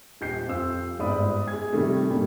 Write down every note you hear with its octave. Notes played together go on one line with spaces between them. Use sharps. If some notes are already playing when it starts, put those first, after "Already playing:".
D#1 G6 C7
F2 F4 E6
G1 G#2 D5 B5 D#6
G#4 G#6
C3 D#3 G3 A3
G2 A#2 G3 A#3